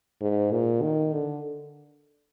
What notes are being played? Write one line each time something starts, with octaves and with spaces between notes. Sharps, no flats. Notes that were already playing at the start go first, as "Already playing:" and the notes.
G#2
A#2
D#3
D3